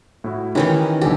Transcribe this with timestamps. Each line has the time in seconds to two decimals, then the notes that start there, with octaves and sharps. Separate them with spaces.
0.24 A2 E4 F#4
0.55 D#3 E3 C#4 D#4 E4 G4
1.01 B1 D3 G4 G#5